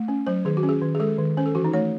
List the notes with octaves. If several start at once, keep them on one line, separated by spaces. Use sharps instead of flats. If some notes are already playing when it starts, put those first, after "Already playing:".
Already playing: A3
C#4
F#3 C5
D#3 G#4
F#4
C#4
G#4
D#3
G#4
G#3 A4
D#3
C#4 C5
A4
E3 F#4
D#4
A3 C#5